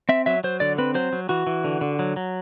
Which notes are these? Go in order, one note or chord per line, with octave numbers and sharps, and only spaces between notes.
C4 E5
F#3 E5
F#3 C5
D3 D5
C4 B4
F#3 C5
F#3
E3 F#4
E3
D3
D3
F#3
F#3